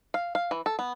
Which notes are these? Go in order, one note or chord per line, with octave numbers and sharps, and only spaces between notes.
F5
F5
E3
A4
B3